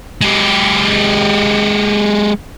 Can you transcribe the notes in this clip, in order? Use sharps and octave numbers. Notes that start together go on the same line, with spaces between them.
G#3 G4